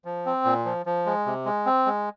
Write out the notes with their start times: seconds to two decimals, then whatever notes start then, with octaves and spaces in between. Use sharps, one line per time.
0.05 F3
0.26 C4
0.45 A#2
0.65 F3
0.86 F3
1.06 G#3
1.26 C3
1.46 G#3
1.66 C4
1.86 G#3